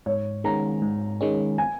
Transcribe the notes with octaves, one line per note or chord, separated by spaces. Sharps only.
G#2 C#5
D#3 G#3 C#4 A#5
G#2
D#3 G#3 C#4
G#5